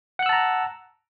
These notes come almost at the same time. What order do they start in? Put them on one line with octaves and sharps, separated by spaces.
F#5 F#6 E6 A5 A#5